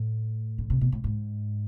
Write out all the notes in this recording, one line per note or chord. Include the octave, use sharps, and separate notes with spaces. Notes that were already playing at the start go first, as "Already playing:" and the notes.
Already playing: A2
D3
C3
B2
A2
G#2